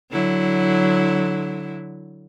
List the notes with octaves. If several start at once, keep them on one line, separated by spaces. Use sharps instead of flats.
D3 F#3 E4